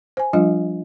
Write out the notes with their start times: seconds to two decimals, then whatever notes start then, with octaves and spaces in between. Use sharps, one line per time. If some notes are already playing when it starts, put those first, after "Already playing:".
0.17 C5 G#5
0.33 F3 G3 D4 F4 D#5